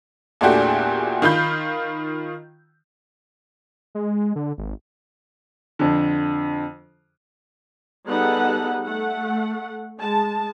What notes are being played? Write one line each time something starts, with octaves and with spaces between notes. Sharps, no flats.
E2 A#2 A3 D4 F#4 G4
D#3 F4 B5 G6
G#3
D3
G#1
F2 D3
G3 B3 D#4 G#4 A4 F#5
A3 F#5
G#3 A5